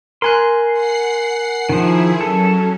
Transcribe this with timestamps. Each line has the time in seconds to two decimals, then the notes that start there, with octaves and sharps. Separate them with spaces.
0.22 A#4 G#5 C6 F#6
0.72 F#5 C7
1.69 D#3 F3 E4 G#4
2.21 F#3 C#4 A4